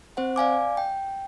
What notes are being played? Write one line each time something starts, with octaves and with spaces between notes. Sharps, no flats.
C4 C5 F#5
D5 F5 G#5 D6
G5